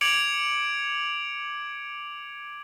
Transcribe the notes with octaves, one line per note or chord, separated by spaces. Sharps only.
D6 G#6 C#7 D7 F7 F#7